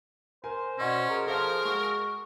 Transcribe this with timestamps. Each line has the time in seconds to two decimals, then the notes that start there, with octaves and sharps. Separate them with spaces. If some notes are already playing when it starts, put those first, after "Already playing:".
0.44 A#4 C5 G#5
0.79 B2 C#4 D5 D#5 F#5
1.10 G#4 A#4
1.27 F3 A4 A#4 C5 F5
1.65 G#3 F#4